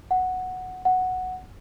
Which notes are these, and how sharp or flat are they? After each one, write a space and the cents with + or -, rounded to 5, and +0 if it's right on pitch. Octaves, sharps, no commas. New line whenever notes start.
F#5 +0
F#5 +0